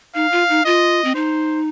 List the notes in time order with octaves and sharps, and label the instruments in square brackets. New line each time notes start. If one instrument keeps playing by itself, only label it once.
[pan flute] D#4 [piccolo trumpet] F5
[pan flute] F4
D#4
[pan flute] F4 [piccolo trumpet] D#5
[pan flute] C4
[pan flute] D#4 [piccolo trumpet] C5